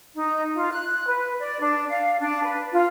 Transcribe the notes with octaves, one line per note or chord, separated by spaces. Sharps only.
D#4
F4
F#6
B4
D5
D4
F5
D4
B4
F4